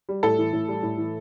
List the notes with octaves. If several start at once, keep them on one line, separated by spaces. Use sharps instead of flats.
G3
A2 A4
E3
A2
G3
A2
E3